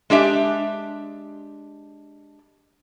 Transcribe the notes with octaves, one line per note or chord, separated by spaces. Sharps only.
G#3 D4 G4 E5